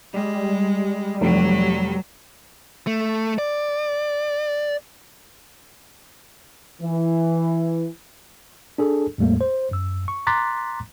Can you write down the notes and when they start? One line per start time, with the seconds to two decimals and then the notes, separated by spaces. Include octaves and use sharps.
0.14 G3 G#3
1.21 F1 F#3
2.87 A3
3.38 D5
6.82 E3
8.78 D4 G#4 A4
9.18 E2 A2 G3 A3 A#3
9.41 C5
9.71 F#2 E6
10.08 C#6
10.27 A#5 C6 D6 F#6 A6 B6